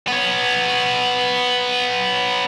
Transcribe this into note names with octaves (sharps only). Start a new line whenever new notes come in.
B3 C#5